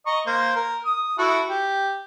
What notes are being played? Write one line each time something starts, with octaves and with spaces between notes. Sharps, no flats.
D#5 A#5 C#6
A#3 C5
A#4
D#6
E4 F#4 A4
G4